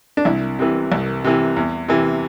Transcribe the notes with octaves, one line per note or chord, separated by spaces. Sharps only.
D4
C2 E4
C3 E3
C2
C3 E3
E2
C3 E3